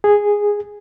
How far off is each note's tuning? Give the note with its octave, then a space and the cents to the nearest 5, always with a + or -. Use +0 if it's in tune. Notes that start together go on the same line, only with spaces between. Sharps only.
G#4 -10